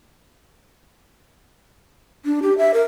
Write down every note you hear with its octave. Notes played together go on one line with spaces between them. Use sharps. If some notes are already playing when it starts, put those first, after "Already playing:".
D4
G4
E5
A#4